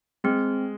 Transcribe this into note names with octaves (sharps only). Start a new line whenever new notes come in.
G#3 C4